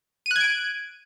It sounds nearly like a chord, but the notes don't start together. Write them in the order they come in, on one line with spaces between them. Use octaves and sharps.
D#7 F#6 G#6 D7